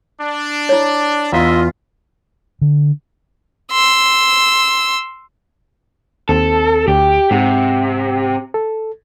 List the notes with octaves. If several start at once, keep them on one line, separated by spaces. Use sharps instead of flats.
D4
E4 C#5
E2 D4 E4 F4 D#5 E5 B6
D3
C6 E6
D#2 C4 A4
D2 G4
G#2 C3 F#5
A4